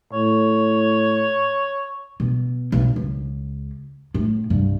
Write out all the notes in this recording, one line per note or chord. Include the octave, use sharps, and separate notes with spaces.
A2 C#5
B2
B1
C#2
A2
C2 G2